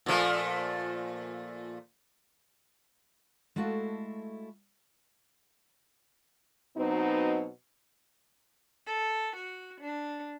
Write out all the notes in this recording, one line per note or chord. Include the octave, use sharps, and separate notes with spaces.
A#2 F3 A3
G#3 A3 E4 F#4 A4 F5
B2 F#3 B3 C4 D#4
A4
F#4
D4